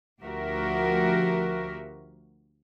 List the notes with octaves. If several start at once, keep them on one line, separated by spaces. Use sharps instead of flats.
D2 F3 F#4 G4 A#4 E5